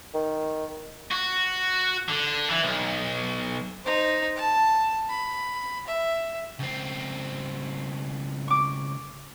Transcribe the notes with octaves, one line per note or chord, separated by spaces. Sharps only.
D#3
F#4
D3
E3
B1
D#4 C5
A5
B5
E5
C#2 C4
C#6 D6